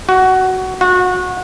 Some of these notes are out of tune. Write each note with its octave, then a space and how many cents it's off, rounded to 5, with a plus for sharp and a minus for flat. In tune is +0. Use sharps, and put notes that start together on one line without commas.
F#4 +15
F#4 -25